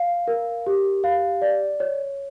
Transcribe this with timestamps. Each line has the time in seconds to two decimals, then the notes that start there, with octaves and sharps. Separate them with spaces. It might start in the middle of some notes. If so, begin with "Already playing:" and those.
Already playing: F5
0.28 A#4
0.67 G4
1.04 F5
1.42 D5
1.80 C#5